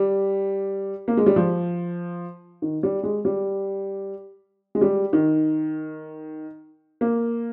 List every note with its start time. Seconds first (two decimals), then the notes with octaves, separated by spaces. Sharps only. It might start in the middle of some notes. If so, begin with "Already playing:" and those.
Already playing: G3
1.08 A#3
1.17 G#3
1.26 G3
1.36 F3
2.62 D#3
2.83 G3
3.03 G#3
3.25 G3
4.75 G#3
4.81 G3
5.13 D#3
7.01 A#3